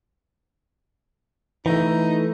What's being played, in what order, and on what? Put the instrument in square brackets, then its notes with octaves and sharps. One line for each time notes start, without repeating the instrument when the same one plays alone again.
[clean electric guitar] E3 A3 [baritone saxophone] D#4